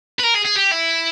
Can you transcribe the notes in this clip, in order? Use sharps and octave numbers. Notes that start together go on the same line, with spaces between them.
B4
A#4
G#4
G#4
G4
E4